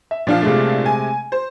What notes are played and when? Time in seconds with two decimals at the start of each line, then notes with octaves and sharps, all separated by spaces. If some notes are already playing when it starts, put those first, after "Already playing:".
0.11 E5
0.27 A#2 F3 D4 F5
0.42 C3 G#3 A3
0.86 G#5
1.32 C5